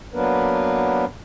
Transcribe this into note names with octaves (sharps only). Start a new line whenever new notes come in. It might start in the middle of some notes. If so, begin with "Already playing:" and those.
F#3 A#3 B3 D4 A#4 B4